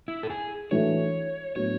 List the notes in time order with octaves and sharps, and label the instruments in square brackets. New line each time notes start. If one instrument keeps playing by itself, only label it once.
[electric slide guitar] E4
A4
G#4
[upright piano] E3 A3 D4 F#4 [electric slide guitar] C#5
[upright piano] A2 F#3 B3 D4 [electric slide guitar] C#5